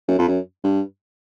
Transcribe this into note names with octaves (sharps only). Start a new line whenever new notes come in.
F#2
F2
F#2
G2